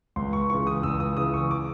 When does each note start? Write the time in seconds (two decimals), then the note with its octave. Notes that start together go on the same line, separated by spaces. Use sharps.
0.16 C#2 C6
0.33 C#6
0.50 C#3 E3 C#6
0.67 D#6
0.83 C#2 E6
1.00 D#6
1.17 C#3 E3 D#6
1.34 C#6
1.51 D6